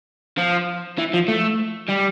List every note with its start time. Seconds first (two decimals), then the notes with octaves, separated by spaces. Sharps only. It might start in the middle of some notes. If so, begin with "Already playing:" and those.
0.38 F3
0.98 E3
1.14 F3
1.28 A3
1.89 G3